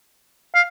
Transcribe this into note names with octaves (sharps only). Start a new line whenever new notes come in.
F5